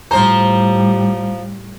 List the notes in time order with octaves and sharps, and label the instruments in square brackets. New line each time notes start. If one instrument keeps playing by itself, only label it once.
[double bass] A2 G3 [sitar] F3 C5 [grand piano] A#5